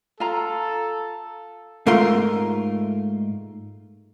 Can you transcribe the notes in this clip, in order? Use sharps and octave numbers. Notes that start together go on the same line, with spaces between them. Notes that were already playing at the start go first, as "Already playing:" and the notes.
F4 A4 A#5
G#2 A3 F4 A#4 C6